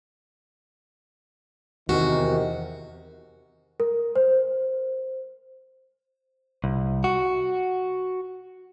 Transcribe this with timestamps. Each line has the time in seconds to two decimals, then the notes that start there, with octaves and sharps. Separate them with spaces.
1.89 E2 C3 D#3 F#4
3.80 A#4
4.16 C5
6.64 C2
7.04 F#4